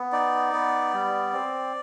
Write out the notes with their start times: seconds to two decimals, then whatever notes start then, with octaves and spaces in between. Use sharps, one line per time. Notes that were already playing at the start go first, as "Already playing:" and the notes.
Already playing: B3
0.12 D#4 D5
0.53 B3
0.93 G3
1.33 C4